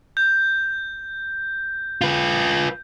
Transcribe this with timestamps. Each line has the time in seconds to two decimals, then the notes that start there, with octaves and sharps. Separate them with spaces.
0.17 G6
2.01 F4 B4